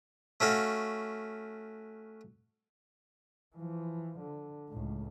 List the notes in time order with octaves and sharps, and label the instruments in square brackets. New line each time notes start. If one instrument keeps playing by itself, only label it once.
[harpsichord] A3 C#4 F#4 F5
[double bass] E3 F3
D3
C#2 A2